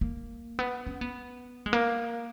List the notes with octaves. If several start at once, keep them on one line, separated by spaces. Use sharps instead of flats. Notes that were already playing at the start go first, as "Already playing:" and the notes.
A#3
B3
C#4
B3
G#3
A#3